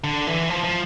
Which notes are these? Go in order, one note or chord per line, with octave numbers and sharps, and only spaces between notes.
D3
E3
F3
F3